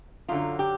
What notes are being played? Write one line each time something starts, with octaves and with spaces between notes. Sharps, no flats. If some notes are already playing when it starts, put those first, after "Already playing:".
F#2 D3 F#3 F4
G4